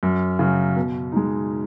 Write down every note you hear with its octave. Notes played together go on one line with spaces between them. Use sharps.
F#2
C#3 F#3
B2
G#3 D#4